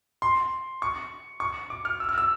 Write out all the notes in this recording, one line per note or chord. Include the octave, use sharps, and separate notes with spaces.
C6
C#6
C#6
D6
F6
E6
F6
E6